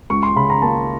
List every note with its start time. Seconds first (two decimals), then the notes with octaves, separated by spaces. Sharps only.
0.10 C#2 C#6
0.23 C6
0.36 C#3 B5
0.50 A#5
0.62 A#3 A5